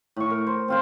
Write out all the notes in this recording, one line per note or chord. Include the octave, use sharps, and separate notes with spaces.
A2 C#6
A#4
C5
C4 F4 C5